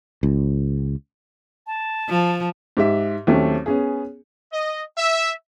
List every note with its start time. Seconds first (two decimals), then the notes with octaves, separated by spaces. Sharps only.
0.23 C#2
1.67 A5
2.09 F3
2.77 G#2 G4 E5
3.27 D#2 F#3 A3 C4 C#4
3.66 B3 C#4 G#4
4.52 D#5
4.97 E5